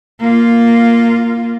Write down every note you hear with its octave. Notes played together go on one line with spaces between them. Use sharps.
A#3 F4